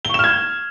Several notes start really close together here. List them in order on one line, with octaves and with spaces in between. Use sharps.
G7 C#6 E7 F6 G#6